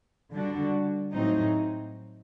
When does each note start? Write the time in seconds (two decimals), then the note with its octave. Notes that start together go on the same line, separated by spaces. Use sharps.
0.32 D3 G3 D4 F#4
1.12 A2 F#3 C4 D#4